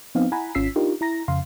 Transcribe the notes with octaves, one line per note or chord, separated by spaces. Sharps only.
F3 B3 C4 D#4 F5
E4 F#5 G#5 A#5 B5
G#1 C#4 F4 E6 B6 C7
D4 D#4 F4 G4 A#4
E4 A#5 A#6
F2 C#3 F5 C6